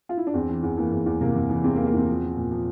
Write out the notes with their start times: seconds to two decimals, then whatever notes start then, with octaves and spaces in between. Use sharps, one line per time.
0.09 F4
0.17 E4
0.27 D4
0.34 E2 C4
0.49 E3
0.63 E2
0.77 E3 A#3
0.92 E2
1.06 E2
1.21 C3 A#3
1.35 C3
1.50 E3
1.64 E2 C4
1.76 E2 A#3
1.86 A#3
1.94 E2 C4
2.07 F3
2.22 F3
2.36 A#2
2.51 F3